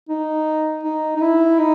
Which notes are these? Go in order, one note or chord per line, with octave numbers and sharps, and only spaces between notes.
D#4
D#4
D#4
E4
D#4